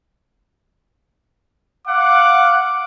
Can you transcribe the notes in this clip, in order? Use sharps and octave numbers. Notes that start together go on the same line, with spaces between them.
F5 F#5 D6